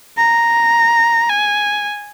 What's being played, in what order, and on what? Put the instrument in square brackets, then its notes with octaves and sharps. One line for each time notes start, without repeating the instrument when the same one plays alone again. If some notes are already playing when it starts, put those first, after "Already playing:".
[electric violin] A#5
G#5